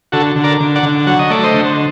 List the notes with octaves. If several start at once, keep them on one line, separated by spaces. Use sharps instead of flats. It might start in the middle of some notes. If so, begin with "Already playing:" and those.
D3 F#4 A4
D3
A#4 D5
D3
D5 F#5
D3
F#3 F#5
D#5
A3 D5
C5 D#5
D3